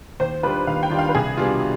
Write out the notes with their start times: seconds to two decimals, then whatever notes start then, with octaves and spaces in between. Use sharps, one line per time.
0.20 D#2 C5
0.43 D#3 G3 D4 F4 B4
0.67 D#2 F5
0.83 G5
0.90 D#3 G3 D4 F4
0.99 F5
1.09 B4
1.15 C2 G#4
1.37 B2 G3 D4 F4